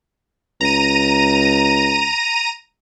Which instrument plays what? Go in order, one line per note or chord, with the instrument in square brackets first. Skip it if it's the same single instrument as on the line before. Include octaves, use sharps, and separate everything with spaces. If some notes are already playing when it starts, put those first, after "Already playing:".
[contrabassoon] C#2 [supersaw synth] A#5 D#7